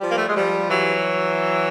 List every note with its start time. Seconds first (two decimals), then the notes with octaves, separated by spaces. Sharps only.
0.01 F3 G3
0.10 A#3
0.18 A3
0.27 G#3
0.35 F3 G3
0.69 E3 F#3